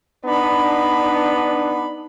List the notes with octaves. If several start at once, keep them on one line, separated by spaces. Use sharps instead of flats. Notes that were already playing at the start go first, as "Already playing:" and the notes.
B3 D4 D#4 B5